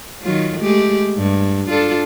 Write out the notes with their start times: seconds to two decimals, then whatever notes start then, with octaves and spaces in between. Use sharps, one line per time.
0.22 D#3 F#3 F4
0.60 G#3 A3 G4
1.17 G2
1.70 D4 F4 A4